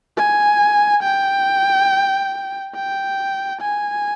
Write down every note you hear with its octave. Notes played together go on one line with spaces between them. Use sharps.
G#5
G5
G5
G#5